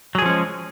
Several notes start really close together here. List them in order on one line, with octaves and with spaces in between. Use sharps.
F#3 G#4 F3 C#4 G#3